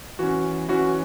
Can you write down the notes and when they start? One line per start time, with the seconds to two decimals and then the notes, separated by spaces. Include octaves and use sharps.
0.19 E3 C#4 F#4
0.69 E3 C#4 F#4